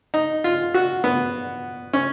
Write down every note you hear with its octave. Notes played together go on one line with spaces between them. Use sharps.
D#4
F4
F#4
B3
C#4